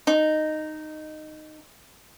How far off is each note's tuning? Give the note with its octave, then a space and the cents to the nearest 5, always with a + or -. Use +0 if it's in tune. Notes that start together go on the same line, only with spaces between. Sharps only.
D#4 -10